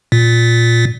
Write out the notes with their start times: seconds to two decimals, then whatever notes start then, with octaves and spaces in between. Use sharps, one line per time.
0.12 A#2